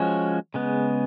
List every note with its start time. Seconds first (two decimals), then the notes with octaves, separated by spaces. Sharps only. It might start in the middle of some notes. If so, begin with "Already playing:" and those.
Already playing: F3 G#3 C#4 F#4 C#5
0.54 C#3 G#3 B3